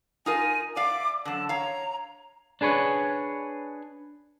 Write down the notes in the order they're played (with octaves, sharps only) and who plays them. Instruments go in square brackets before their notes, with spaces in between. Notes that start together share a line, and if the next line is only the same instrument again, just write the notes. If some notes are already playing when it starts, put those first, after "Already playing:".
[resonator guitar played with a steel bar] D#4 F4 A#4 [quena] G#5
[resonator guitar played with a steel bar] D5 E5 F5 [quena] D6
[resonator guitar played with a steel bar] F#2 D3 [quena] A5
[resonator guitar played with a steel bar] C#5 F5 [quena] A#5
[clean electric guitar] D4 G#4 B4 C#5